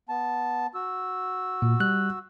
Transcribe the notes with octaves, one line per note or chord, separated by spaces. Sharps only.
B3 A5
F#4 E6
A#2
G3 F#6